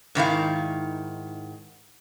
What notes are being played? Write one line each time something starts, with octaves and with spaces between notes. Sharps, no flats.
G#2 D#3 E4 F5